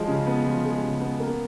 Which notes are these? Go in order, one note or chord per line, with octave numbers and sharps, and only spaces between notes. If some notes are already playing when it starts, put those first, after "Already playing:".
Already playing: F3 G#3
C#3
B3
F3
G#3
C#3
B3
A#3